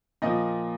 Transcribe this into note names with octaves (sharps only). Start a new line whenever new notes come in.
A#2 F3 D#5